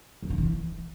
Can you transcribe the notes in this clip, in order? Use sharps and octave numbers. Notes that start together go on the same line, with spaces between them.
F#2
D3
E3